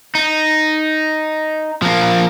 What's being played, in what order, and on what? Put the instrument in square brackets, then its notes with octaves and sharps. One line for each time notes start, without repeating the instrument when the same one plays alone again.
[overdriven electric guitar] D#4
F3 A#3